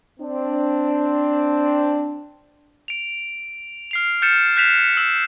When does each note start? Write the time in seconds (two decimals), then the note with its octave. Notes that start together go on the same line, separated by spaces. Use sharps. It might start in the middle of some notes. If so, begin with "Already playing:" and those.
0.20 C4 D4
2.88 D7 F7
3.91 F6 C7 F7
4.22 F6 G6 A6 C#7 E7
4.57 F#6 G6 B6 C7 E7 F7
4.97 E6 C#7 E7